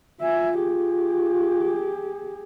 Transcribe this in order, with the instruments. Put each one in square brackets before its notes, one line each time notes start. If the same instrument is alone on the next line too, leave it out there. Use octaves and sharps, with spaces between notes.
[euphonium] F4 [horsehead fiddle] E5 G#5
[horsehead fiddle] G4 G#4